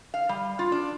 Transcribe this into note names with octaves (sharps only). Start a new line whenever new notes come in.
F5
G3
F4
D4